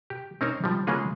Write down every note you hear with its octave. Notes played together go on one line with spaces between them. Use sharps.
G4
C4 C#4 D#4 A#4 C5 C#5
F3 G3
C#3 G#3 A#3 C#4 F4 G#4